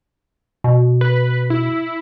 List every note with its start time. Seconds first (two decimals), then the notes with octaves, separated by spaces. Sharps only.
0.64 B2
1.01 B4
1.50 E4